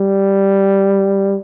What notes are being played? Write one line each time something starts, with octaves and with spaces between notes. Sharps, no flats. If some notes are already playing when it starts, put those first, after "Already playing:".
Already playing: G3